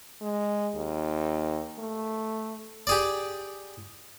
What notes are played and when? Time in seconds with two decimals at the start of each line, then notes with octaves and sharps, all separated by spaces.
0.21 G#3
0.75 D#2
1.78 A3
2.87 G4 G#4 D5